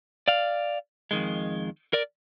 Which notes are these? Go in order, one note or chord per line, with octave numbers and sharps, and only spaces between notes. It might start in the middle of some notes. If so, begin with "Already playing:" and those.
D5 F5
F2 D#3 G#3
A#4 D5